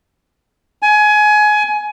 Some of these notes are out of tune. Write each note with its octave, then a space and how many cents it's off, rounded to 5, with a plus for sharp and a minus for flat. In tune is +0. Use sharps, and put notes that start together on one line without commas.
G#5 +25